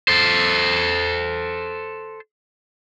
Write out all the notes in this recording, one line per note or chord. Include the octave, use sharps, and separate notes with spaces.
A4 C5